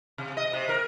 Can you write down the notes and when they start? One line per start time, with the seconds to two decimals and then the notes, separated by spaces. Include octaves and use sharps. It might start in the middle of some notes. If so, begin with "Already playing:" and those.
0.18 C3
0.37 D#5
0.53 C3
0.69 A#4